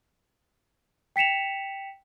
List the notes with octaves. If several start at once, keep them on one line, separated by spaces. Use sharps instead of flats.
G5 B6 C#7 E7 F7